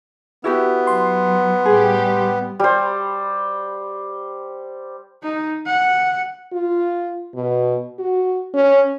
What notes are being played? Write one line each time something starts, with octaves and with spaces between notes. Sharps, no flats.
B3 E4 F#4 G4
F#3 C6
A2 G3 G4 G#4
G3 C5
D#4
F#5
F4
B2
F#4
C#4